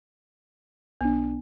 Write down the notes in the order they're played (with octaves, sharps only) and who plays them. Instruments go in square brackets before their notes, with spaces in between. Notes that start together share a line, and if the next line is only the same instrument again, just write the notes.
[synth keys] B1 D4 [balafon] B3